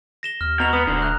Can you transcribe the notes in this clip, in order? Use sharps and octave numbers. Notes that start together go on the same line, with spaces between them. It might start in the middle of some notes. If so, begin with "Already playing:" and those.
A#6 E7 G7
D#2 F6
B2 A#5 F7
B3 D#6
D#1 D2 D3
F#6